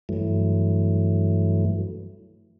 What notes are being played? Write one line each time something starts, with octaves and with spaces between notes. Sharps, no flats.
G2 E3 F#3 A3